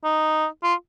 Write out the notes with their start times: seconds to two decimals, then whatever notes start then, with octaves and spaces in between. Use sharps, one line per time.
0.04 D#4
0.63 F4